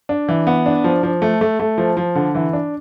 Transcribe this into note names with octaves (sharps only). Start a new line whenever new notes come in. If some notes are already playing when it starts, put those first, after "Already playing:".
D4
E3
B3
D4
F3
F3
A3
A3
A3
F3
F3
D3
E3
D4